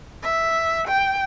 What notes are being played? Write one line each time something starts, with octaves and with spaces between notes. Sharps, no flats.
E5
G5